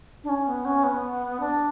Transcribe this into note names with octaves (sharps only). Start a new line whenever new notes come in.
D4
C#4
B3
C#4
B3
D4